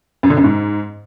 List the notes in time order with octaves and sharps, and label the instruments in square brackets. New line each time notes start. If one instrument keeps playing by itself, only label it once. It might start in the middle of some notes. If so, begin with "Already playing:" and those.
[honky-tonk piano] F#2
D3
F#2
G#2